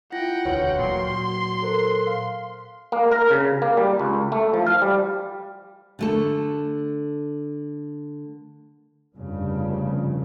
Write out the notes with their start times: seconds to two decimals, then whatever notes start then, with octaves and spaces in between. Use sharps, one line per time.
0.12 E4 F4 F#5 G5 A#6
0.45 E1 D2 F#4 B4 C#5
0.79 A#2 F#3 C6
1.10 F#4
1.62 A4 A#4 C5
2.07 F5
2.92 A#3
3.11 A#4
3.30 C#3
3.62 A#3
3.77 G3
3.99 C#2
4.32 A3
4.54 F3
4.67 F5
4.82 G3
5.99 D3 A3 A4
9.15 F1 G2 C#3